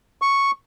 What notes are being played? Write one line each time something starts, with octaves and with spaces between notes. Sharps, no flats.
C#6